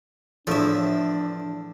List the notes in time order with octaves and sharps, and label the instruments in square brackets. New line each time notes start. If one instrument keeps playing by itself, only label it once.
[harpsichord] E2 F3 [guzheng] A2 E5 [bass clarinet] D4